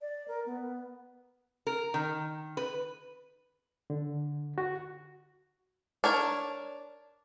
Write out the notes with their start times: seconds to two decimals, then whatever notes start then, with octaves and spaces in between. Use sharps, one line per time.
0.01 D5
0.28 A#4
0.46 B3
1.67 A#4
1.94 D#3
2.57 B4
3.90 D3
4.58 F#4
6.04 D4 A#4 C#5